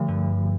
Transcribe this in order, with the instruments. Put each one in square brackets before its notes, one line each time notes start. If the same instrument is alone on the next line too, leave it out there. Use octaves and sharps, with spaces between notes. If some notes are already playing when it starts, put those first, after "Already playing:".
Already playing: [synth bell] D3 F3 A3
[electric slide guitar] G2